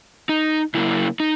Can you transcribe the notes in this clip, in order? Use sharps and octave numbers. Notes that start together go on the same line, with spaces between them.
D#4
C#3 F#3 A#3 E4
D#4